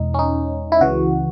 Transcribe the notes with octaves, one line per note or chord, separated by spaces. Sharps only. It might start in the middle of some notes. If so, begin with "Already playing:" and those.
Already playing: E2 B2 G#3 D#4
C#4
D#4
E4
C#2 C#3 E3 F#4